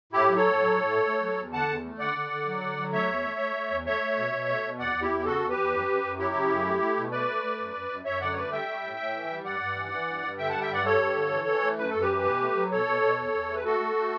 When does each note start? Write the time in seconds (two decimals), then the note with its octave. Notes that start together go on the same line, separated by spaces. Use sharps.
0.12 A2 E4 G4
0.28 F#3
0.36 A4 C#5
0.44 A2
0.59 F#3
0.76 A2
0.90 A3
1.07 A3
1.21 F#3
1.37 E2
1.52 D3 F#5 A5
1.68 E2
1.84 A3
1.99 D3 D5 F#5
2.14 D3
2.31 D3
2.46 F#3
2.61 D3
2.77 F#3
2.93 A3 C#5 E5
3.08 E2
3.24 A3
3.39 A3
3.55 A3
3.70 E2
3.86 A3 C#5 E5
4.01 A3
4.17 B2
4.33 B2
4.48 A3
4.63 B2
4.79 E2 D5 F#5
4.95 E2
5.02 E4 G4
5.11 E2
5.20 G4
5.25 C#3 F#4 A4
5.41 E2
5.49 G4 B4
5.57 E2
5.72 F#2
5.88 F#2
6.03 F#2
6.18 F#3 E4 G4
6.34 C#3
6.50 F#2
6.65 A3
6.82 A3
6.97 B2
7.11 A3 B4 D5
7.28 A3
7.43 A3
7.59 F#2
7.74 F#2
7.89 F#2
8.05 F#2 C#5 E5
8.21 D3 D5 F#5
8.32 C#5
8.36 A3 B4 D5
8.52 G3 E5 G5
8.67 G3
8.83 A2
8.98 A2
9.14 E3
9.30 G3
9.44 G2 D5 F#5
9.60 G2
9.75 E3
9.91 E3
10.07 G2
10.23 G2
10.38 D3 E5 G5
10.49 G3 F#5 A5
10.61 E5 G5
10.69 G2 D5 F#5
10.84 G3 A4 C#5
11.00 G2
11.15 D3
11.31 E3
11.47 E3
11.62 A3
11.78 F#2 B4
11.90 F#2 A4
12.01 G4 B4
12.09 E3
12.25 B2
12.41 A3
12.55 F#3
12.70 B2 A4 C#5
12.86 B2
13.02 B2
13.18 E2
13.33 E2
13.49 A3
13.55 B4
13.64 A3 F#4 A4
13.80 A3
13.95 A3